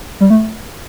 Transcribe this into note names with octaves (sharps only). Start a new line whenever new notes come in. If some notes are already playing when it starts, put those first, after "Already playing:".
G3
A3